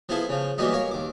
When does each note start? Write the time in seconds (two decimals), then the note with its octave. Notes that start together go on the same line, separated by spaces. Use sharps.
0.09 F3 B3 E4 G#4 A4
0.29 C#3 F3
0.58 E3 F#3 G3 A#3 B3 D#4
0.73 A#4 C#5 F5
0.91 D#2 D6